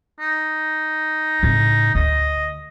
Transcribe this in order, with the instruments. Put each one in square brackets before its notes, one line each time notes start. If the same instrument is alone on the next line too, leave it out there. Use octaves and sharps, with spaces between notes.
[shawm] D#4
[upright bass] A2 C#3
[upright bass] D2 [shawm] D#5